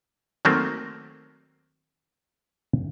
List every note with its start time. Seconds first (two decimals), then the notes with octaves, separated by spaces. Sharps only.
0.45 D#3 F#3 A3 A#3 C4